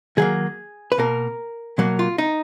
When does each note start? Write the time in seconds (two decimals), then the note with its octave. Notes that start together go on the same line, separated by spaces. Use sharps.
0.17 D#3 F#3 A#3 G#4
0.92 B4
0.98 B2 A#3 A#4
1.78 B2 F#3 A#3
1.99 F4
2.18 D#4